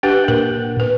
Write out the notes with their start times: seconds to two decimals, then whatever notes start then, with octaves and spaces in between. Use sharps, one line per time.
0.03 D4 G4 B4 F#5 G5
0.28 A#2 A#4
0.80 B4